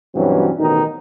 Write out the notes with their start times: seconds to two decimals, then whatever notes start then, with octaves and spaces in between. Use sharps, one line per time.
0.15 G2 B2 E3 F#3 C4 C#4
0.59 A1 B2 D#3 D#4